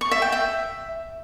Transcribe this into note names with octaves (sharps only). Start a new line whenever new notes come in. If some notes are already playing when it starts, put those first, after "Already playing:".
C#6
E5
G5
E5